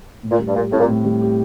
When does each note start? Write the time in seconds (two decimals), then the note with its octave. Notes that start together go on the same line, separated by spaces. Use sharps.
0.23 A2
0.31 A#2
0.39 G3
0.48 G2
0.56 A#2 G4
0.72 A2 C4
0.80 A#2
0.88 A2
1.05 G3
1.21 G4